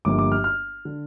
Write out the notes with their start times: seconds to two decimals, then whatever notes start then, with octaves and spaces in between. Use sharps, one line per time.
0.05 G1 G2 D3 F3 A#3 D6
0.19 D6
0.32 F6
0.44 F6
0.85 D3